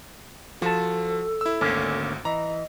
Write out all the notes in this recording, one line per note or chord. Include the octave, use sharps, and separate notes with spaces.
F3 F#4 A4 A5
E4 E6
G#1 D2 D3 A#3 C#4
E3 D#5 A#5